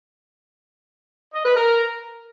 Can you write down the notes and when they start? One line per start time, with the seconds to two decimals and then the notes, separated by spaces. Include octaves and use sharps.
1.34 D#5
1.45 B4
1.56 A#4